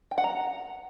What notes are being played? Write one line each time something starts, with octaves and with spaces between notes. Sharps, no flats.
G5
F#5
A#5